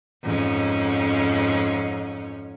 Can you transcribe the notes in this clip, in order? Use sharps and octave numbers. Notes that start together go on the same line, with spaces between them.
F2 G#2 C#4